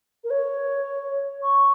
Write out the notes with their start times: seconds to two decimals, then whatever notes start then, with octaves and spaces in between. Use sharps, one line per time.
0.24 A#4
0.30 C#5
1.43 C#6